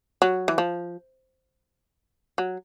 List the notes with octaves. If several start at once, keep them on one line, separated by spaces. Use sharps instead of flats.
F#3
E3
F3
F#3